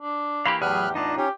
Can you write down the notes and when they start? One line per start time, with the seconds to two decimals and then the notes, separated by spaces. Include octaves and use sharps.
0.02 D4
0.46 E3 A#3 G4 F5 B5 C6
0.62 E2 A2 F#3 G4 G#4 B5 F6 F#6
0.95 D4 D#4 F4 D#5 A5
1.17 C#4 G4 C#5